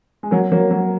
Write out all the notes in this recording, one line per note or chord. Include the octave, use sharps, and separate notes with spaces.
G#3
F#3 A#3
F#3 A#3
F#3 A#3